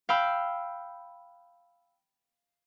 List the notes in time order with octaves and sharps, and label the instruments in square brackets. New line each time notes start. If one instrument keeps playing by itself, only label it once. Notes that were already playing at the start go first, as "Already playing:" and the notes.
[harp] F5 G5 B5 E6